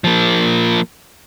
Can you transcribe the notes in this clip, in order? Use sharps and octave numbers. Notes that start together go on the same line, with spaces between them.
F3 A#3